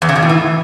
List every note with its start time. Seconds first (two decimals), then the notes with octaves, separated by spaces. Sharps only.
0.02 E2
0.09 C#3
0.16 B2
0.22 A2
0.29 E3